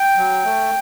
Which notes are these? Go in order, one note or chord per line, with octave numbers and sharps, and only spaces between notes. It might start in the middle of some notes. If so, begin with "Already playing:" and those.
Already playing: G5
F#3
A3